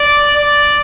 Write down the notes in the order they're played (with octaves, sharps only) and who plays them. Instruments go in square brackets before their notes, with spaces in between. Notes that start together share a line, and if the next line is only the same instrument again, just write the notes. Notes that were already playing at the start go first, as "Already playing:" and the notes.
Already playing: [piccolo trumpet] D5
D5